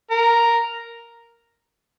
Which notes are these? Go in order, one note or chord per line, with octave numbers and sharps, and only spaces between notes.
A#4